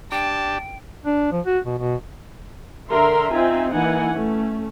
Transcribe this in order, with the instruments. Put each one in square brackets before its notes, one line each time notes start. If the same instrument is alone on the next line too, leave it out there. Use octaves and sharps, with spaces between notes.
[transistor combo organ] D4 G4 [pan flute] G5 [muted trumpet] A5
[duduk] D4
F3
F#4
B2
B2
[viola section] D3 A#4 E5 C6
C4 D#4 F4 E5 G#5
E3 A#3 D#4 F#5 G#5
A3 C#4